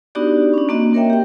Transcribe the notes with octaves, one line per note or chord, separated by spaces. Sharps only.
B3 D4 D#4 F#4 G4 D5
C#4 D4
A#3 C4 D4 F#4 D#5
A#3 A#4 C#5 E5 G5
G4 G5